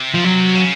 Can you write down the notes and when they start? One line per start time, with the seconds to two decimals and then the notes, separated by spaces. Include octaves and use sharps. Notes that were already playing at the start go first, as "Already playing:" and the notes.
Already playing: C3
0.14 F3
0.24 F#3
0.56 C#3